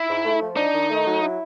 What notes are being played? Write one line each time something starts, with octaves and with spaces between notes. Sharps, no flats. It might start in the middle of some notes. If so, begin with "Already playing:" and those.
Already playing: E4
G#2
A3
F3
D4 D#4
D#3
A3
F#3
E4